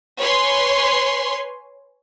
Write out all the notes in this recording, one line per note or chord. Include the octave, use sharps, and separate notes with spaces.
B4 C#5 G#5 C6